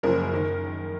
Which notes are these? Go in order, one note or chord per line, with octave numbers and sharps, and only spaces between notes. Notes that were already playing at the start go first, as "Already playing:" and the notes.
F#1 F#2 C#3 F3 A#4
D#3